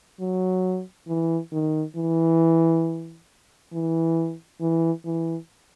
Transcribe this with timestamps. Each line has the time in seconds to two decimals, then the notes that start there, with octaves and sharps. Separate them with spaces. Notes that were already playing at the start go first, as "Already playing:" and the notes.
0.20 F#3
1.08 E3
1.52 D#3
1.96 E3
3.73 E3
4.61 E3
5.05 E3